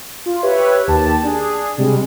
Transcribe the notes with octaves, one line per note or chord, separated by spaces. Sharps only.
F4
G4 B4 C#5 E5
D#2 G4 A5
D4 G#4
C3 G3 G#3